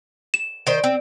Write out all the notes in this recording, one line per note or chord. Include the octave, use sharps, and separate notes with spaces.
E7
D#3 C5 D5
C4